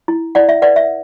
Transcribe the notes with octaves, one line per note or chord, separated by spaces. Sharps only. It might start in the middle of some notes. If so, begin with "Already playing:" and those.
E4
E4 D5 F#5
E5
B4 D5 F#5
E5